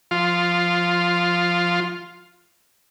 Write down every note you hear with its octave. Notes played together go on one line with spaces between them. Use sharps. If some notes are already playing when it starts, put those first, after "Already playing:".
F3 F4 C6